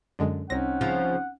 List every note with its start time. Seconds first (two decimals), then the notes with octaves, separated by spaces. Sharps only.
0.19 F#2 D3 G#3
0.50 C2 C4 C#4 D#4 F#5 A#6
0.81 C#3 F3 F4